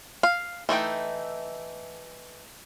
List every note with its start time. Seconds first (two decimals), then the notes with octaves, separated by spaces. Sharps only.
0.23 F5
0.69 E3 A3 D#4 G5